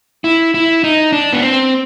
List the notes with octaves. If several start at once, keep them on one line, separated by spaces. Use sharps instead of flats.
E4
E4
D#4
D4
B3
C4